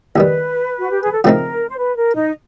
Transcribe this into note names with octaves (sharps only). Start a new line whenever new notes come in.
D#2 D#3 G3 B4
F#4
G4
G#4
A4
C#3 F3 A3 C4 D#4 A#4
C5
B4
A#4
D#4 D#5